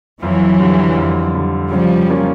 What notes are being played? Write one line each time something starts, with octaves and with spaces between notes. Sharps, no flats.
F2 E3 F#3
D3 G3
F2
D3 G3
C#3 F3 G3
F#3 A#3 C#4 F4